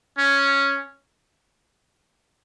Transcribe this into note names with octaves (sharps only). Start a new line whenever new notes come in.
C#4